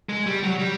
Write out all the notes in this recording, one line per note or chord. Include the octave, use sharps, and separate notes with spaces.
G#3
G3
F#3
G3